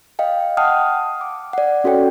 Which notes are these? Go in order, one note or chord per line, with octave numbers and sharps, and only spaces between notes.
D#5 F5 G5
F#5 G5 A5 D#6 F6
D6
D5 F#5
C#4 F#4 A4 C#5 G5